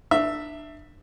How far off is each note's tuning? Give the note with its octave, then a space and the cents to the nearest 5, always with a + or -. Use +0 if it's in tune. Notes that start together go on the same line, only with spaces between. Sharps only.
D4 +25 E5 +0